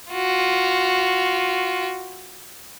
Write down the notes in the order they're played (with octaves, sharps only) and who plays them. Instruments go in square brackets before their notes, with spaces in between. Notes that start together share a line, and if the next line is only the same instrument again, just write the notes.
[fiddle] F4 F#4